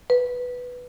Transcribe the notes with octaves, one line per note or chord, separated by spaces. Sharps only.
B4